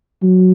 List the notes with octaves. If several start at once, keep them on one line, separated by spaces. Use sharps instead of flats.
F#3